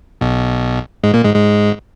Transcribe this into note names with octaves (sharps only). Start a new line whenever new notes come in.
B1 B2
G#2 G#3
A#2 A#3
G#2 G#3
G#2 G#3